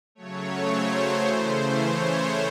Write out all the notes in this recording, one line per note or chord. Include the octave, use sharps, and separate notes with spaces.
C#3 F#3 A3 C#5
C5
C#3 E3 A3 C5
C#5